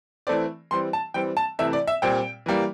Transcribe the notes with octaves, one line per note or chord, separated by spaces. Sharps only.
E3 A3 C4 D5
E3 G3 C4 C6
A5
E3 G3 C4 G5
A5
C3 E3 A3 E5
D5
E5
A#2 G3 C4 G5
E3 G3 A#3